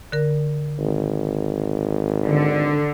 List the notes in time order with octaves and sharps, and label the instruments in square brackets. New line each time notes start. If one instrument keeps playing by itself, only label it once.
[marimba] D3 A#4
[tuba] G#1
[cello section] D3